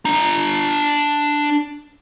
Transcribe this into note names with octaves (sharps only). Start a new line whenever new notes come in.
D4 A#5